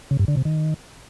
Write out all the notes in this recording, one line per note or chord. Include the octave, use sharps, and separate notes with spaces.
C#3
G2
D3
C3
D#3